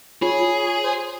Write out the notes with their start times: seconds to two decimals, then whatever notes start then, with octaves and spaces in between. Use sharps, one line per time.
0.22 F4 G#4 C#5
0.83 C5